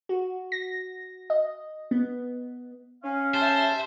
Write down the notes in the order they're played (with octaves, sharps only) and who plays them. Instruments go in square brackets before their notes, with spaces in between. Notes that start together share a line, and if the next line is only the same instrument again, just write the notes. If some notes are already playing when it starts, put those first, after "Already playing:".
[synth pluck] F#4
A#6
D#5
B3
[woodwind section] C#4 F5
[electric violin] G4 E5 [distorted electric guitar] C5 [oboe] A5